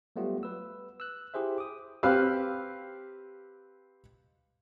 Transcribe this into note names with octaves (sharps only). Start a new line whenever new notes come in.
F#3 G3 A3 B3 F4 G4
B4 E6
E6 F#6
E4 G4 G#4 C5 E5
D6 D#6
C4 G4 B4 F5 E6